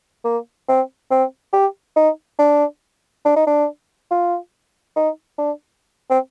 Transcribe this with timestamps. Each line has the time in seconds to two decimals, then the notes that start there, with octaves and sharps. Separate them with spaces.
0.25 A#3
0.68 C4
1.11 C4
1.53 G4
1.96 D#4
2.39 D4
3.25 D4
3.36 D#4
3.47 D4
4.11 F4
4.96 D#4
5.38 D4
6.10 C4